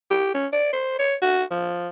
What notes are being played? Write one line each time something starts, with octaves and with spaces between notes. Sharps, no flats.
G4
C#4
D5
C5
C#5
F#4
F3